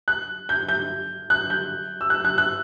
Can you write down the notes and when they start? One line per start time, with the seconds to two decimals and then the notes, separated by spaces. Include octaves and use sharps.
0.08 F#6
0.49 G6
0.68 G6
1.30 F#6
1.50 G6
2.01 E6
2.10 F#6
2.25 F#6
2.38 F#6